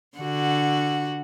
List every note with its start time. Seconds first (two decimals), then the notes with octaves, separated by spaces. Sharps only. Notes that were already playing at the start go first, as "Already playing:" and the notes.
0.18 D3 F#4